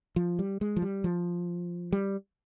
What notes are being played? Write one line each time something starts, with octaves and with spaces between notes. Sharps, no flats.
F3
G3
G#3
F3
G3
F3
G3